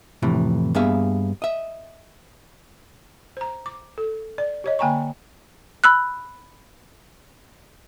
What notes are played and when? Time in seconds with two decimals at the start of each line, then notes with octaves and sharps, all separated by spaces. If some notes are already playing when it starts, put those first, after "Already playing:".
0.22 F2 A2 C3 E3
0.75 G2 A#3 B3 G#4 E5 F5
1.42 D#5 E5
3.37 C5 A#5
3.66 D6
3.98 A4
4.38 D5
4.64 G4 C#5 D#5
4.79 D3 A#3 G5 G#5 A#5 C#6
5.84 B5 E6 F#6